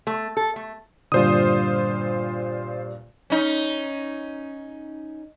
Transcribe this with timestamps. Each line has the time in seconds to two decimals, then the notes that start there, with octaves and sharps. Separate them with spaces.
0.07 A3
0.37 A4
0.56 A3
1.12 G2 A#2 D3 F4 C5 D#6
3.30 C#4 D#4